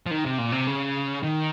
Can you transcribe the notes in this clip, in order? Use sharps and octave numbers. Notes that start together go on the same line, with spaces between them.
F3
D#3
C3
A#2
C3
C#3
D#3